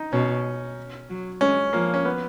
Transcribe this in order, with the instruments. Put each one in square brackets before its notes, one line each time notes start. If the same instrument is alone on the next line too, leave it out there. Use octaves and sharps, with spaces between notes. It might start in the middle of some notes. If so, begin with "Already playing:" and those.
Already playing: [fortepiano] D#4
[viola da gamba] B2 [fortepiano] C#4
[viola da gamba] F#3
[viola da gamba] G#3 [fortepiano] C#4
[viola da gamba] F3 [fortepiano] A#3
[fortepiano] C#4
B3